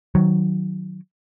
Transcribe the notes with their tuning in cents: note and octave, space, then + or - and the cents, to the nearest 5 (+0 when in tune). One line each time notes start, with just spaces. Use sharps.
D#3 +0 F#3 +0